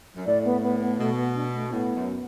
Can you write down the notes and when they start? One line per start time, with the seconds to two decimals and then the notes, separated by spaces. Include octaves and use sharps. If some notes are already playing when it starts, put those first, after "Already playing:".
0.16 F#2
0.26 A2 D5
0.45 B3
0.63 B3
0.81 B3
0.99 B2 A3
1.17 B3
1.35 D4
1.53 A3
1.71 A2 B3
1.96 F#2